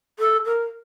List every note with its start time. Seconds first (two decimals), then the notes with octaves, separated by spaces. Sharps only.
0.19 A4
0.45 A#4